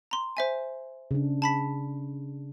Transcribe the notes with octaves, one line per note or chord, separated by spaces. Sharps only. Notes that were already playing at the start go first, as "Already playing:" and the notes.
A#5 C6
C5 E5 G#5
C#3 D4
A5 B5 B6